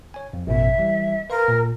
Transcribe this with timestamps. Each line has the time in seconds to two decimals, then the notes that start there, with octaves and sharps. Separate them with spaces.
0.14 C#5 G#5
0.33 F2
0.47 A1 F#2 B2 E5
0.78 E3 G3
1.30 A#4 B4 F5 C6
1.48 A#2